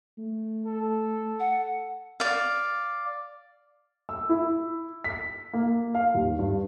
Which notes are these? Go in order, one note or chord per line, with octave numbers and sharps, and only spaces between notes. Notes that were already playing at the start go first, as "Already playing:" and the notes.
A3
A4
F#5
D5 F5
E6
E4
B6
A#3
F5
D#2
G2